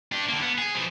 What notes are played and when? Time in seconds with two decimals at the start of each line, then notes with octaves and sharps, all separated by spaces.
0.12 D4 G4
0.28 D3 A#3
0.41 B3
0.58 G#4
0.75 B2 F3